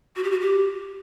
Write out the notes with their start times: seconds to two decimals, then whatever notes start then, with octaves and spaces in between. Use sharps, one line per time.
0.16 F#4
0.24 G4
0.31 F#4
0.41 G4